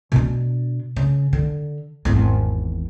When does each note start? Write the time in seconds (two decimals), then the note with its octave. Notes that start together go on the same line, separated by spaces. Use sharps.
0.12 B2 D4
0.96 C#3
1.33 D3
2.05 G#1 E2